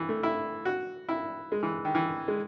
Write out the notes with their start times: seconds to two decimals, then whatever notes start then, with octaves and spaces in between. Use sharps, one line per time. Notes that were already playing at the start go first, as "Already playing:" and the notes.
Already playing: E3
0.09 A3
0.23 E4
0.65 F#4
1.09 E4
1.52 G#3
1.63 E3
1.85 D#3
1.95 E3
2.28 G#3